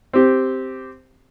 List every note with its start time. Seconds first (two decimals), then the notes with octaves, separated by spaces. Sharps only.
0.13 C4 G4